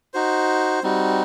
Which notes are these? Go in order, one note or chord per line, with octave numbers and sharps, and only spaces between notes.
D#4 F#4 C5
G3 C4 D#4 F#4